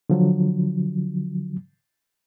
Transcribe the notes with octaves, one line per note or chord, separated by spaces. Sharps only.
D3 F3 F#3